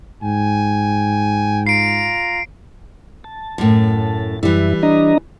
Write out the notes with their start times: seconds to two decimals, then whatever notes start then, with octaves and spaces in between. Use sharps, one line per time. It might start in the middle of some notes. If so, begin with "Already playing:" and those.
0.23 G#2 G5 G#5
1.67 F4 A#5 C7 D7
3.24 A5
3.58 F#2 A2
4.43 F#2 E3 G3 E4
4.83 D4 D#5 A#5